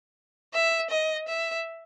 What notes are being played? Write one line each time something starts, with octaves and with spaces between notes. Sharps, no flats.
E5
D#5
E5